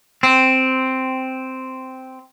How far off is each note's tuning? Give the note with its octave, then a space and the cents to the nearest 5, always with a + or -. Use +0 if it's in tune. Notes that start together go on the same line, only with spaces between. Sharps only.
C4 -5